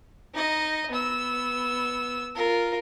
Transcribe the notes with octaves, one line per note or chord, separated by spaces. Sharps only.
D#4 D#5
B3 E6
F4 A#4